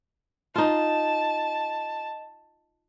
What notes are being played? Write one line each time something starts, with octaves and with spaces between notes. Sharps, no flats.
D#4 F4 A5